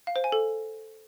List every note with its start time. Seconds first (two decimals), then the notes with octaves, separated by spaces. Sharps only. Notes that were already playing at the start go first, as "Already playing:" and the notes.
0.07 F5
0.16 C5
0.24 G#5
0.32 A4